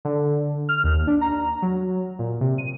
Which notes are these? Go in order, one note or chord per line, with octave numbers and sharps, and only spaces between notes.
D3
F6
D#2
D4
A#5
F#3
A#2
C3
D#7